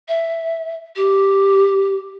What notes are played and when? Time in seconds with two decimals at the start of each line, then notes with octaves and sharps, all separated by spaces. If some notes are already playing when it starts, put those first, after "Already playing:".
0.08 E5
0.96 G4